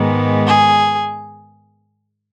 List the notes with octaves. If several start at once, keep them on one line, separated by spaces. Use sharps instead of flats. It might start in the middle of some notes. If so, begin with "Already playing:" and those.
Already playing: G#2 D#3 G#3 B3
G#4